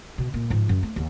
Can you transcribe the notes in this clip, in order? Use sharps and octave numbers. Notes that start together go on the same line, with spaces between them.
B2
A#2
G#2 F3
F#2
A3
D#2